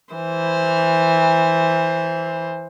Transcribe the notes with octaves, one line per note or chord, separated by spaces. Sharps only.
E3 C5